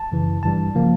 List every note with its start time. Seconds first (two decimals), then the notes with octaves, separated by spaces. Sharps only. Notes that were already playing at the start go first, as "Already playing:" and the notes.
Already playing: A5
0.12 F#2 C#3 E3
0.43 G#1 G2 E3 G3 A5
0.75 C#3 F3 A#3